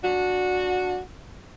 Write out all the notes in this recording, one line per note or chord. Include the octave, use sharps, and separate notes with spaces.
D4 F#4